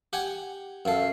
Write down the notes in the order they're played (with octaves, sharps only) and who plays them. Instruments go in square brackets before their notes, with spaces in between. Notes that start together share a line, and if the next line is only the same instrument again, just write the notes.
[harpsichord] G4 F#5 G#5
[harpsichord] F#2 A4 [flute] F5